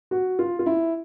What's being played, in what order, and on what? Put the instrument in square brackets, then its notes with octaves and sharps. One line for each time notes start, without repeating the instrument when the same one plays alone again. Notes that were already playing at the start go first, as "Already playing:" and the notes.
[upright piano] F#4
F4
F4
E4